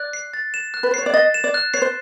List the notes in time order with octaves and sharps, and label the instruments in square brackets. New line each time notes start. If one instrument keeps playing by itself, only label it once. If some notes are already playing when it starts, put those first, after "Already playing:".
Already playing: [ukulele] D5 [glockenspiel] F#6
[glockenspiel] C7
A6
E7
F#6
[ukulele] B4
C5
[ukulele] C#5 [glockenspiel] C7
[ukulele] D5
[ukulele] D#5 [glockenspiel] A6
[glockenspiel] E7
[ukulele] D5
[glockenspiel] F#6
[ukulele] C#5 [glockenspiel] C7
[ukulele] C5